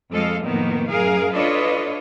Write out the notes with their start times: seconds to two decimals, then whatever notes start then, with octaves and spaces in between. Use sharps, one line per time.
0.11 F2 G#3 A4 D#5 F5
0.44 F2 A2 D#3 A#3 B3
0.89 F#2 G#4 A#4 F5
1.34 D4 F4 A4 B4 C#5 D#5